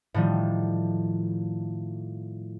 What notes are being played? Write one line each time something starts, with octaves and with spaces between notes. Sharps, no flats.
A2 D#3 F3 G3